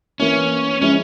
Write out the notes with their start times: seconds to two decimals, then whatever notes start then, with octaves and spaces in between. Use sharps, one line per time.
0.20 E3 A#3 C#4 E4
0.81 F3 G#3 C#4 E4